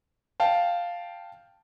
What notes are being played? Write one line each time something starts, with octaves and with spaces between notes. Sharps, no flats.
F5 G5 A5